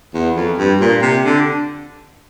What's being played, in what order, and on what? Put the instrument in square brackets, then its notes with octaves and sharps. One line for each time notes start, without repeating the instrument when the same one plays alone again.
[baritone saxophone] E2
F2
G2
A#2
C3
D3